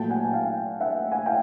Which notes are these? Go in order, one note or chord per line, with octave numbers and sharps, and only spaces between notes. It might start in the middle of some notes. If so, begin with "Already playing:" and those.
Already playing: A#2 F#3 A3 G5 A5
F#5 G#5
G#5
F5 G5
E5 F#5
F#5 G#5
F5 G5